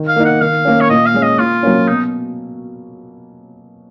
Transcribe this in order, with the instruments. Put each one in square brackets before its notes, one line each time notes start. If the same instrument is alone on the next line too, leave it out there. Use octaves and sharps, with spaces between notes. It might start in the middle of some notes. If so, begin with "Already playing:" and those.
Already playing: [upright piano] D#3
[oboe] F5
[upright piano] A#3 D#4
[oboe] F#5
[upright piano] D#3 [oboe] F5
[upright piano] A#3 C#4
[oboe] C#5
[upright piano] A#2 [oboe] D#5
[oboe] F5
[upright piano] G#3 C#4
[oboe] D#5
[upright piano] A#2 [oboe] F4
[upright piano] F#3 A#3 C#4
[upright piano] B2 [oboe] D#4